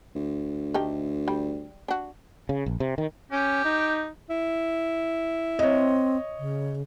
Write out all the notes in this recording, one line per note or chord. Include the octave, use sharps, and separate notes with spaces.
D2
D#3 A3 G4
G3
D4 F#4
C#3
A#1
C3
D#3
C#4 G4
D#4
E4
C4 C#5 D#5
C#3